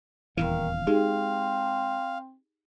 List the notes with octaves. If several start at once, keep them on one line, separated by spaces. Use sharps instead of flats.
D#1 E2 D#3 E3 F5
G#3 C4 D#4 G4 G#4